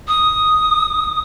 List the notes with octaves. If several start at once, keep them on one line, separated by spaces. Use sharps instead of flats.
D#6